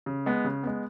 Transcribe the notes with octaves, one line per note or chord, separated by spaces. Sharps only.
C#3
G#3 B3
C#3
G#3 B3